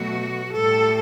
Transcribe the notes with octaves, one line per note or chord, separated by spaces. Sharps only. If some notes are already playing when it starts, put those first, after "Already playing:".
Already playing: B2 F#3 A3 F#4
A2 G3 A4